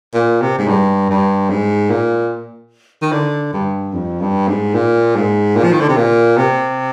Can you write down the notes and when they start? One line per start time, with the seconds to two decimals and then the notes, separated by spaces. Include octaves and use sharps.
0.14 A#2
0.41 C3
0.58 G#2
0.68 G2
1.09 G2
1.49 G#2
1.90 A#2
3.02 D#3
3.12 D3
3.53 G2
3.93 F2
4.21 G2
4.48 G#2
4.74 A#2
5.15 G#2
5.56 A#2
5.63 F3
5.72 D#3
5.80 D3
5.88 C3
5.97 A#2
6.37 C3